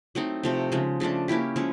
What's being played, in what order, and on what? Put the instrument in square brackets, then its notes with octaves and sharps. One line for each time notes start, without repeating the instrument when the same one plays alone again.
[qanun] F#3 A3 C4 D#4
C3 F3 A3 C4
C#3 F3 G#3
C#3 F3 A3 D4
A#3 C#4 E4 G4
F3 G#3 C#4 E4